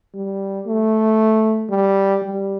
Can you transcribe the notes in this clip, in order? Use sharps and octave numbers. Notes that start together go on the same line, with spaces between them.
G3
A3
G3
G3